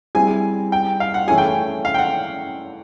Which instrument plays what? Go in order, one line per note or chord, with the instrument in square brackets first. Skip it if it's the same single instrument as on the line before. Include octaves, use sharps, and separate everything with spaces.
[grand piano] G3 C4 E4 G#4 [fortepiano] G#5
[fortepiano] G5
F5
F#5
[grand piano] E3 A3 C#4 E4 G#4 [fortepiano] G#5
[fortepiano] G5
F5
G5
F#5